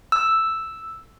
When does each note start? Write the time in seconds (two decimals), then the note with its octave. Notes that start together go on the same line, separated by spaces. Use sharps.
0.12 E6